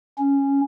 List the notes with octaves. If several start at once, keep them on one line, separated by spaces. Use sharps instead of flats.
C#4